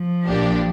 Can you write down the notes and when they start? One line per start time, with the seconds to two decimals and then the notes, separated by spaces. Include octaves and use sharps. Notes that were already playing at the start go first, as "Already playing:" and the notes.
Already playing: F3
0.26 A#1 A#2 A#3 D4 G4